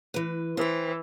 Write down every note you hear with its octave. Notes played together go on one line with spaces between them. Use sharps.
E3 B4
E3 C5 G5